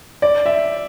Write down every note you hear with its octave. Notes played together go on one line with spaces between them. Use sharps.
D5
E5